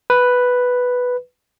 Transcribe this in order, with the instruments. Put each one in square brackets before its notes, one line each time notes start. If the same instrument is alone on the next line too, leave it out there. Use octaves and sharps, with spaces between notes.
[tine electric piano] B4